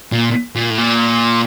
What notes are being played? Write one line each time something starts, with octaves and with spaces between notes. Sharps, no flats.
A#2
A#2
A2
A#2